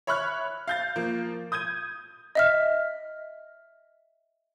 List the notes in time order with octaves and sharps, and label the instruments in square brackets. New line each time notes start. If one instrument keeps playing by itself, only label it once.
[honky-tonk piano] C#5 E5 B5 C#6 F6 F#6
F5 G6 A6
F3 A#3
D#6 G6 G#6 D#7
[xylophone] D#5 E5 F6